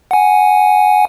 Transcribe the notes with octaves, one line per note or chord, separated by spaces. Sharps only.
F#5 G#5